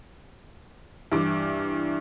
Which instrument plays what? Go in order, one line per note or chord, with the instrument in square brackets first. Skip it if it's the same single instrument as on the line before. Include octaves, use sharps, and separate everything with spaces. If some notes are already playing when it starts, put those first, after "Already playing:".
[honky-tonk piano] G2 E3 D6